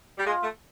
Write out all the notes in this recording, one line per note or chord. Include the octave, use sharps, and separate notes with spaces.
G3
G#3 F4
A3